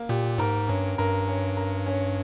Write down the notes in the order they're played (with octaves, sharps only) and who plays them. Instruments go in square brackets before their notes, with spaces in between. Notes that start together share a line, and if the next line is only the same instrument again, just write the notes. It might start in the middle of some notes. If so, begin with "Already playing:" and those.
Already playing: [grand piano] A#3
[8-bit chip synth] A#2 [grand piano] G4
[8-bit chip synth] G#2 [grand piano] A#4
[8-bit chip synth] G2 [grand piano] C#4
[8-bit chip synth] G2 [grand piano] A#4
[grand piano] C#4
A#4
C#4